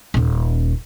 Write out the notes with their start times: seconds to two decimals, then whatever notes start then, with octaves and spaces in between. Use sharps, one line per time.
0.14 D#1 C#4